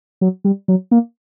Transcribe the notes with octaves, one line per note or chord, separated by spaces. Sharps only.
F#3
G3
F#3
A#3